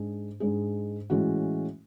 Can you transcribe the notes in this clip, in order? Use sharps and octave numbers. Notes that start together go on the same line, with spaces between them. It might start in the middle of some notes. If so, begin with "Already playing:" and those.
Already playing: G#2 G#3 D4 G#4
G#2 G#3 D4 G#4
A2 E3 G#3 C#4 F#4